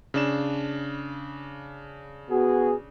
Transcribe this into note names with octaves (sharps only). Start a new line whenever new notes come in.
C#3 D4 E7
B3 F#4 G#4